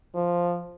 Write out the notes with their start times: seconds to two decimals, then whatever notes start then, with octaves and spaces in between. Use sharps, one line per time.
0.15 F3